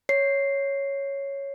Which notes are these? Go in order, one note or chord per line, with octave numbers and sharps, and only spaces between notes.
C#5 C7